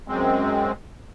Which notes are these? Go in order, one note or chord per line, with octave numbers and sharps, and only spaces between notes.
F#2 G#3 C4